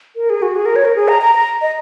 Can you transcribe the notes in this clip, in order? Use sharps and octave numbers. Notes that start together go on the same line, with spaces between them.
A#4
G#4
F#4
G#4
A#4
C#5
A#4
G#4
A#5
A#5
A#5
D#5